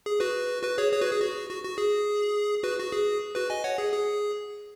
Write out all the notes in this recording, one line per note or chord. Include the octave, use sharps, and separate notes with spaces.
G#4
F#4 B4
F#4 B4
G#4 C#5
G#4 C#5
F#4 B4
G#4
F#4
F#4
F#4
G#4
F#4 B4
F#4
G#4
F#4 B4
D#5 G#5
C#5 F#5
G#4
G#4